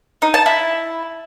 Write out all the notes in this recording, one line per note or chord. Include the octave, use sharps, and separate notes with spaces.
D#4
A5
E4